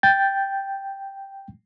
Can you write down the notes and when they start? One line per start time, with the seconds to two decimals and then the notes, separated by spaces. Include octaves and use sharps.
0.03 G5 G6 A6